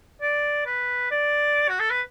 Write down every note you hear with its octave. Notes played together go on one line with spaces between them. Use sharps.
D5
B4
D5
F#4
A4
B4